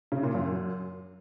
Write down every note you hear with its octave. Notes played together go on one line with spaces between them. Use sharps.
C#3
A#2
F#2